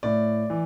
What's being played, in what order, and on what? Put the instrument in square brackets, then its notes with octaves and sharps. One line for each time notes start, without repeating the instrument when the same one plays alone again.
[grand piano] A2 D5
E3